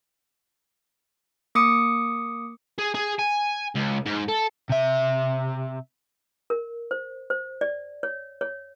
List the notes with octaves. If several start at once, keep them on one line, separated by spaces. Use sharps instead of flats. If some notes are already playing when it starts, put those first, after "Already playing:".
A#3 D6 D#6 C#7
G#4
G#4
G#5
C#2
G#2
A4
C3 E5
A#4
C5
C5
D5
C#5
C#5